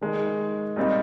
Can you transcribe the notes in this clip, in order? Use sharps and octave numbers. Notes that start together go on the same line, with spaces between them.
D#3 G#3 D#4
A#2 G3 C4 D#4